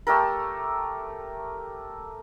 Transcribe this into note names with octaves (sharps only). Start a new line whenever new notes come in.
A3 G4 A4 A#4